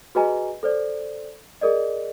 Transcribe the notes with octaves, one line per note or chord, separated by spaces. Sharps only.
F#4 G#4 B4 D#5 G#5 A#5
A4 C5 D5
G#4 A#4 D5 D#5